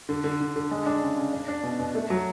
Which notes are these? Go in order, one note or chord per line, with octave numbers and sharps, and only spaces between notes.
D3
D3
D3
D3
G#3
D4
C#3
C#3
D4
D4
B2
B2
A3
F#3